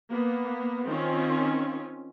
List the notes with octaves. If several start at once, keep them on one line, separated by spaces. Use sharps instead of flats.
A#3 B3
D#3 C4 C#4 F4